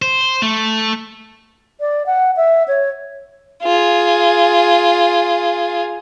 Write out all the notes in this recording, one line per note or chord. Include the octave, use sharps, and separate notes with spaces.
C5
A3
D5
F#5
E5
C#5
F4 G#4